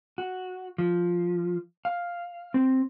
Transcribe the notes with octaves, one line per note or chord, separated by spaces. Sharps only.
F#4
F3
F5
C4